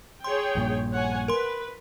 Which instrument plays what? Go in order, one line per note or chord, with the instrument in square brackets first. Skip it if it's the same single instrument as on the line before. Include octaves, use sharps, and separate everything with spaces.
[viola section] G#4 C#5 G5 [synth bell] C6
[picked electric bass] A#1 G2 A#2
[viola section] C#5 F#5 G#5
[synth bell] A#4 C6 [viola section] B4